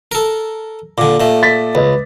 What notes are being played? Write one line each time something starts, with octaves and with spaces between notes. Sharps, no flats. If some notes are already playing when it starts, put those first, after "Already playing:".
A4 A#4
A#2 D3 D6
A#2 A3
A6 B6
C#2 B4 D#5